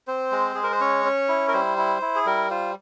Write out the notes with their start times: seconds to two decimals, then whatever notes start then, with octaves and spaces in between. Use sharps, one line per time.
0.07 C4 C5
0.32 G#3
0.55 G#3 G#4
0.63 A#4
0.72 C5
0.81 C#4 C#5
1.04 C#4
1.29 E4
1.48 A#4
1.53 G3 C5
1.78 E4
2.02 E4
2.16 G#4
2.26 G3 A#4
2.50 F4 C5